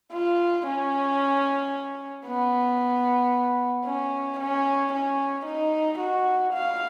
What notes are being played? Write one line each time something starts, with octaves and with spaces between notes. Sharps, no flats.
F4
C#4
B3
C#4
C#4
C#4
D#4
F#4
F5